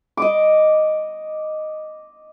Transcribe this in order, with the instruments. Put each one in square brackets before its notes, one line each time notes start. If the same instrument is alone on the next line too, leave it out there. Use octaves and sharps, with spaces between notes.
[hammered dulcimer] D#5 D6